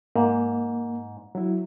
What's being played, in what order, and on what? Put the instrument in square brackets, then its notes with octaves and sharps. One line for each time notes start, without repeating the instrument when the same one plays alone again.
[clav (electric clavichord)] G#2 [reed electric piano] A#3
[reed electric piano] F#3 E4